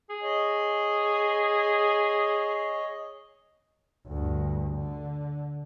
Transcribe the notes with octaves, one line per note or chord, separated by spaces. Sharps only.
G#4
C#5 D#5
D2 G2
D3